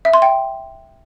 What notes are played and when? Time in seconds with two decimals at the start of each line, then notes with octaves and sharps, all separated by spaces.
0.05 E5
0.14 C6
0.22 G5